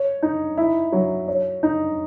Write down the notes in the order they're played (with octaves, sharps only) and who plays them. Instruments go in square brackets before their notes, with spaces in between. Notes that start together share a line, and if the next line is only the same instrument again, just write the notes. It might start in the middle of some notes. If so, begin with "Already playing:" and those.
Already playing: [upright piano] C#5
D#4
E4
F#3
C#5
D#4